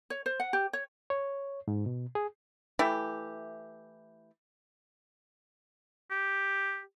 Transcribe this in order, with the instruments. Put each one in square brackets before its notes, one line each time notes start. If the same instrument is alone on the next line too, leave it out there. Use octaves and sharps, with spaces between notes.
[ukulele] C#5
C5
F#5
G4
C#5
[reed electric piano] C#5
G#2
B2
G#4
[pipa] E3 A3 E4 G4
[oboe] G4